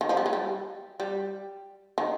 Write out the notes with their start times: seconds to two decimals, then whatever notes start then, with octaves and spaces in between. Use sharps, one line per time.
0.01 D#3
0.09 F3
0.17 G3
0.26 G#3
0.33 G3
1.00 G3
1.98 D#3